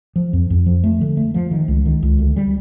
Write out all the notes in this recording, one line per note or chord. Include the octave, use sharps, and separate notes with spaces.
F3
F2
F2
F3
A3
D3
A3
F3
D#3
C#2
D#3
C#2
D2
G3